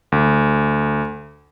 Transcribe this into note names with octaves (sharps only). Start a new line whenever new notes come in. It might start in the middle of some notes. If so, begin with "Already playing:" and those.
D2